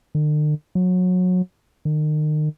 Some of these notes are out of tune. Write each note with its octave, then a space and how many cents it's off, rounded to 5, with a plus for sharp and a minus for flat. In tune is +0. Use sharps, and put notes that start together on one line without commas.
D3 +45
F#3 -25
D#3 -35